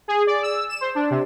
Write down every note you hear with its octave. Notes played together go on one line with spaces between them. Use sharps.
G#4
D5
E6
E7
C5
D4
C3